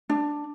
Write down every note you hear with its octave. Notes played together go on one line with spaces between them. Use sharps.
D4